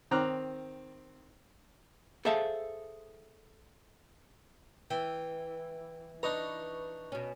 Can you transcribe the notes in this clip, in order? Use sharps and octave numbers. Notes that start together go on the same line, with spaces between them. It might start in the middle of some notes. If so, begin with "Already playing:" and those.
D#3 C4 A#5 D6 F6 F#6
G#4 A4 C5 E5 F5 A5
E3 G5
D4 D#4 B4 A#5 C#6
B2 C#4